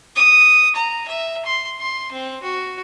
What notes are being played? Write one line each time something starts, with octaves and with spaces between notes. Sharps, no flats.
D#6
A#5
E5
C6
C6
C4
F#4